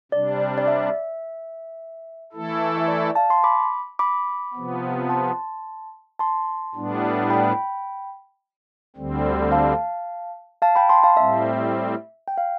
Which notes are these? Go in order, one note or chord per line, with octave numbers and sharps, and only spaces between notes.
C3 G3 D4 D5
D5
E5
E3 A3 E4 A4
E5
D5
F5 A5
A5 C6
B5 D6
B5 D6
C3 F3 B3
A5 C6
A5 C6
A2 G3 B3 D4
G5 B5
D2 D3 G3 C4
F5 A5
F5 A5
G5 B5
A5 C6
F5 A5
A2 G3 C4 E5
G5
F5